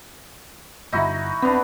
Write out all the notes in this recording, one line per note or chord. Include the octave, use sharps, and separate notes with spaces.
G1 G2 D3 D#4 E4 F#4
D#1 B3 C4 D4